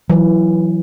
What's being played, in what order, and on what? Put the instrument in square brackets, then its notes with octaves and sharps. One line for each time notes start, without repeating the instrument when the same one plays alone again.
[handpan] E3 [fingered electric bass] F#3